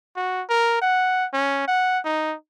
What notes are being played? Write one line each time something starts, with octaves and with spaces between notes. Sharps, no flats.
F#4
A#4
F#5
C#4
F#5
D#4